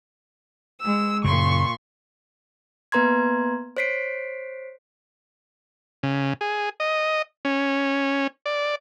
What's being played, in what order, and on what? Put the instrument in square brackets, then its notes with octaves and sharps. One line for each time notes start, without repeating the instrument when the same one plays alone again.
[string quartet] G#3 E6
[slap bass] F#2 C#3 [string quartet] A#2 C6 C#6
[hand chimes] A#3 B3 B4 A#5 C6 G#6
C5 C#5 B6 C7 D7
[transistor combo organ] C#3
G#4
D#5
C#4
D5